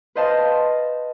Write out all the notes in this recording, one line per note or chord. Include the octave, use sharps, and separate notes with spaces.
B4 C5 D#5 F5 A5